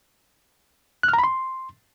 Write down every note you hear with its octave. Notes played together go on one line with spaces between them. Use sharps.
F#6
F6
A#5
B5
C6